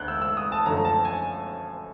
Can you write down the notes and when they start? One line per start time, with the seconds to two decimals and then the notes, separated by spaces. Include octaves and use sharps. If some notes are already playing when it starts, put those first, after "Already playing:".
Already playing: D2 D3 F#6 G6
0.08 E6
0.22 E6
0.37 D#6
0.52 A5
0.66 F#2 D3 F3 A3 A#5
0.77 A#5
0.85 A5
1.05 G#5